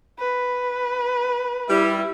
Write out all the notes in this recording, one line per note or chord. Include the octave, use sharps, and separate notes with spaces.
B4
G3 E4